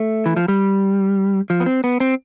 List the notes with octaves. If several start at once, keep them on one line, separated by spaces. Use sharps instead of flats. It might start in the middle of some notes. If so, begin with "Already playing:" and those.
Already playing: A3
E3
F3
G3
F3
B3
C4
B3
C4